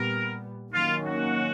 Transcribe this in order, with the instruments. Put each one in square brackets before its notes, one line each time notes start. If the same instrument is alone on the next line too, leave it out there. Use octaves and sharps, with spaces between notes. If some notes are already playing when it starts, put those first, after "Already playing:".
Already playing: [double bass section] A#2 G3 B3 [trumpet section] A#4
[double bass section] D#3 F#3 A#3 C#4 [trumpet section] F4
[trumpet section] F#4